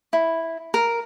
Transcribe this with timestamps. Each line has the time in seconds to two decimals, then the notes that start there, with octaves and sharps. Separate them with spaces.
0.13 E4
0.74 A#4